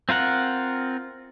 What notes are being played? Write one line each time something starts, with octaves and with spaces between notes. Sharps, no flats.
C4 F4 A#4 F#5